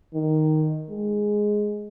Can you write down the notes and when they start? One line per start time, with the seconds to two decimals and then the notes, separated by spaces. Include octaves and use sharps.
0.14 D#3
0.90 G#3